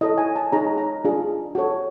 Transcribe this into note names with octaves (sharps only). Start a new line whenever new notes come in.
E4 A4 C#5 D#5
G#5
A5
D#4 G#4 C#5 A#5
A#5
D4 F4 G#4
F#4 A4 C#5